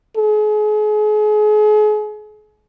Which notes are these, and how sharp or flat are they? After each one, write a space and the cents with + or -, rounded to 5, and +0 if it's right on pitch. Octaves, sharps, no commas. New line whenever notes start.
G#4 +35